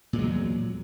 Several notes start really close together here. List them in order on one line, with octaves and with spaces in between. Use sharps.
A#2 G#3 F#3 E2